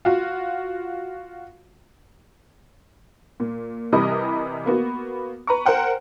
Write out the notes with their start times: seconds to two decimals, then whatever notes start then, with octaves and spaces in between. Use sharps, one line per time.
0.05 F4 F#4
3.40 A#2
3.92 C3 E3 G3 A#4 D#5 D#6
4.66 A#3 B3 F#4
5.47 B4 A#5 C#6
5.65 A#4 C5 F#5 G5